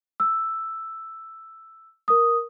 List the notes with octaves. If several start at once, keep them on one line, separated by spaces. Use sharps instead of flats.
E6
A#4 D#6